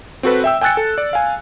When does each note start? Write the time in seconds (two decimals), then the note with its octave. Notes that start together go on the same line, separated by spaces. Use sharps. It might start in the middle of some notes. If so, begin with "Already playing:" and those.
0.23 C4 F#4 A4 B4
0.44 E5 G5 E6
0.61 G5 G#5 E6 F#6 A6 C#7
0.77 A4
0.98 D5
1.13 F5 G#5